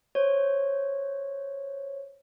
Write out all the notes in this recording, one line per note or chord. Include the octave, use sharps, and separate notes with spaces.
C5 C#5